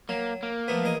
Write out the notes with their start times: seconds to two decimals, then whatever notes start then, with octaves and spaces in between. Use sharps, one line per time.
0.09 F#3 A#3
0.43 A#3
0.68 F3 A3 B3
0.84 E2 A#4 D#5